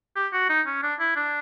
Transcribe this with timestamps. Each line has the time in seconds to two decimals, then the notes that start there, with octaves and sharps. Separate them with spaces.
0.16 G4
0.33 F#4
0.49 D#4
0.67 C#4
0.83 D4
1.00 E4
1.16 D4